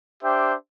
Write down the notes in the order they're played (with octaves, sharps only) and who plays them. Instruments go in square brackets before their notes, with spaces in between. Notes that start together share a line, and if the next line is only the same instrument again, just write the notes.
[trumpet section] D4 G4 C5 E5 G5